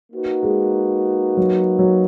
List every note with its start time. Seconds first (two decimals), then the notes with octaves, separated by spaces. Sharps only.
0.12 A#3 D#4 F#4 B4
0.43 G#3
1.37 F#3
1.79 F#3